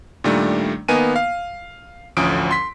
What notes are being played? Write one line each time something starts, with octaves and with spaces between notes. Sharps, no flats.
A#2 D#3 G3 A3 D4
D#3 A#3 B3 D#5 G#5 D#7
F5
A1 D2 F3 C#4 D#6 D7
C6 B6